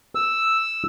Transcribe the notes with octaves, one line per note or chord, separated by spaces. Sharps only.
E6